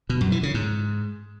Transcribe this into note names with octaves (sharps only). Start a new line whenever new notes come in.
B2
F#2
E3
C#3
G#2